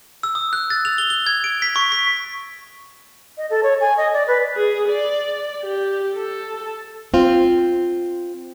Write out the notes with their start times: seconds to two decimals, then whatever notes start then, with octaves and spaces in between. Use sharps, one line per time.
0.23 E6
0.35 D#6
0.53 F#6
0.70 A6
0.85 F7
0.98 G7
1.10 G7
1.27 G#6
1.44 D7
1.62 B6
1.76 C#6
1.92 B6
3.38 D#5
3.50 A4
3.63 C#5
3.81 G#5
3.97 D#5
4.13 D5
4.28 B4
4.56 G#4
4.89 D5
5.63 G4
6.15 A4
7.14 C4 F4